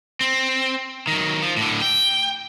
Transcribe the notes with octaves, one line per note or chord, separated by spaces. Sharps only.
C4
D#3 F#3
F3
A2 D3
G5